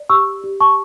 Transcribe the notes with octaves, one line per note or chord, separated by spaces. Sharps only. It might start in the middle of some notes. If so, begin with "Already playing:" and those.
Already playing: D5
G4 C#6 E6
G4
A5 C#6